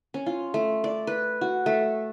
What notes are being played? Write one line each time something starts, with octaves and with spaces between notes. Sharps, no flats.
C#4
F4
A3
D5
B4
F#4
A3